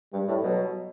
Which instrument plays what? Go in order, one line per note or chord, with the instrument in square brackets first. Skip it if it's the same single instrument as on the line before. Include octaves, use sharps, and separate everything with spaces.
[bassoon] G2 [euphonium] G3
[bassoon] A2
[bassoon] B2 [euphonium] F#3